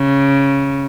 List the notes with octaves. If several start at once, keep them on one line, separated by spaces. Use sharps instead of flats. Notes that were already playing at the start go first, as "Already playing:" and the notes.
Already playing: C#3